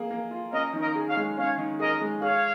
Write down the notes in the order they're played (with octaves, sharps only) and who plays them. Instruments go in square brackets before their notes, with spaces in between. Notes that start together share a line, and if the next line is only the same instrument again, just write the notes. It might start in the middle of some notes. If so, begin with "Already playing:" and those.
Already playing: [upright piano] A#3 G#4
A#3
F4
[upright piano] C#4 [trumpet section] A#4 D#5
[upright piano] D#3
[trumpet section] A#4 D#5
[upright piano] G#4
[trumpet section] C#5 F5
[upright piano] G#3
[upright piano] C#4 [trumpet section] C#5 F5
[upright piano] D#3
[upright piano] G#4 [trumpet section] A#4 D#5
[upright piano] G#3
[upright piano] G#4 [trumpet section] C#5 F5